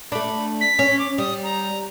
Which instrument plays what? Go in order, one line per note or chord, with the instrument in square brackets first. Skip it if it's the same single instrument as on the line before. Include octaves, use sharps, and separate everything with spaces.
[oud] A3 D4 [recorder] B5
[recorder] B6
[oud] C#4
[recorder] D6
[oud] G3 [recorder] D#6
[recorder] A#5